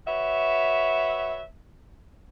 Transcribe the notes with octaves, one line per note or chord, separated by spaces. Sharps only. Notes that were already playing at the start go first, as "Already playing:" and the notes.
F#4 B4 C#5 E5